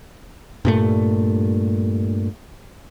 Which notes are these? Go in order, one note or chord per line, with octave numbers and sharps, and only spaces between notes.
G2 A#2 A3